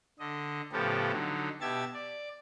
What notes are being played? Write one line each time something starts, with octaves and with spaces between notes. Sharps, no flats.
D3 D#5
A2 C#3 F3 B3 G4 A4
D3 F#3 D#4
B2 G4 E5 A5 G#6 A6
D5